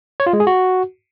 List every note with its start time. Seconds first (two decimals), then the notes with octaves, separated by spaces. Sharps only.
0.20 C#5
0.26 F4
0.33 G#3
0.40 G#4
0.47 F#4